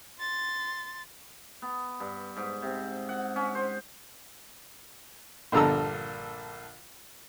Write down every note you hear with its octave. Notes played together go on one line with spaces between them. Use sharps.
C6 A6
B3
G2
G#2
C3
F#5
C#4
C5
A#1 G2 D3 A4 A#5 E6